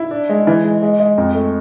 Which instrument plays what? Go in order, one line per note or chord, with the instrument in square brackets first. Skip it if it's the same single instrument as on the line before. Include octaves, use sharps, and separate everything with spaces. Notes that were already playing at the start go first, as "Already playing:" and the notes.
Already playing: [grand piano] E4
D4
G#3
E3
G#3
G#3
G#3
F2
A3